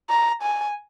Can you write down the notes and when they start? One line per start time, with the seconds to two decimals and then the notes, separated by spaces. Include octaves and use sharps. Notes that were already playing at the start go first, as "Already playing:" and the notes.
0.09 A#5
0.42 G#5